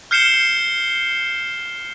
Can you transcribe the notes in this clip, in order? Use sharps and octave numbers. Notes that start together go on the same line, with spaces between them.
F6 G6 C7 C#7 E7 G7